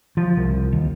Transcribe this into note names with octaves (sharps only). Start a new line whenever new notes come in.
F3
C2
D#2